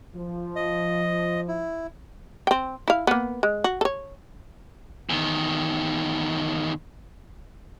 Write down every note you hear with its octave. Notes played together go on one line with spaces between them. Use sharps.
F3
D#5
E4
C4 G5
E4 F5
A#3 B3
G#3
F#4
A4 C#5
E2 D#3